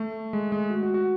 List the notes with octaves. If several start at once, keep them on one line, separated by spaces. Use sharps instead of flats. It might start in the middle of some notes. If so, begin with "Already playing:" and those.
Already playing: A3
G#3
G#3
F#4
F#4
F#4